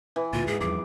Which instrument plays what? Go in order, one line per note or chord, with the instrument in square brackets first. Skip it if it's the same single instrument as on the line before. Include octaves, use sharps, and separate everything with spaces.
[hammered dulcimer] E3
[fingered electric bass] D2 A#2 [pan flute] F4
[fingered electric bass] G#2 [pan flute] G#4
[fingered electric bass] E2 G2 F3 [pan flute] G#4 [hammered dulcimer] D6